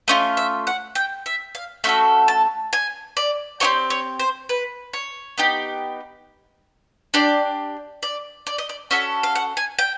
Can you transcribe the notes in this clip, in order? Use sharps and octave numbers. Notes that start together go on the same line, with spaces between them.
A3 C#4 F4 D#5
E5
F#5
G5
E5
F5
A3 C#4 F#4 A4 E5
A5
G#5
D5
C4 D#4 G4 C#5
C#5
C5
B4
C#5
B3 D#4 G4
D4 G4 D5
D5
D5
D#5
D5
C#4 F#4 A4 E5
F5
F#5
G#5
G5